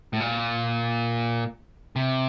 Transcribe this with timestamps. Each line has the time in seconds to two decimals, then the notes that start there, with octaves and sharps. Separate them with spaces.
0.13 A2
0.20 A#2
1.96 C3